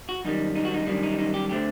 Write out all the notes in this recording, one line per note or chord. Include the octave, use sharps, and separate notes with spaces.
F#4
F#2 D#3 G3 D#4
D#4
F#4
D#4
F#2 D#3 G3 D4
D#4
D#4
G4
D3 A3 C4 G4